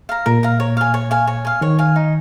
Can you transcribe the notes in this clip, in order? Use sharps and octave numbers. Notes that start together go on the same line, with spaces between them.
F5 A#5
A#2 A#4
F5 A#5
C#5
F5 G#5
C#5
F5 G#5
C#5
F5 G#5
D#3 C#5
F5 G#5
D#4